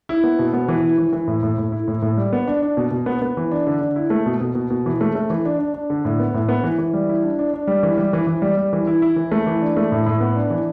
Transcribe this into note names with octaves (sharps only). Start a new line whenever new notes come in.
E4
B3
B2
B3
E3
E4
E3
E3
A2
A2
A2
E4
A2
A2
G3
B3
D4
D4
B2
B2
B3
B3
E3
D4
D3
D3
E4
A3
B2
B2
B2
B2
E3
A3
A3
E3
D4
D4
D4
D3
A2
B3
A2
B3
E3
E3
G3
E4
D4
D4
D4
G3
E3
G3
E3
E3
G3
G3
E3
E4
E4
E3
A3
E3
D4
A3
A2
A2
B3
D4
E3